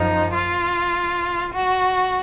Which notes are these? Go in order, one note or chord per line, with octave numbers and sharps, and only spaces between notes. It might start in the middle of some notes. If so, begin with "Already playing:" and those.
Already playing: F#2 F3 D#4
F4
F#4